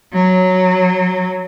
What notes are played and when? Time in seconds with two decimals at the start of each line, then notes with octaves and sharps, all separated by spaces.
0.13 F#3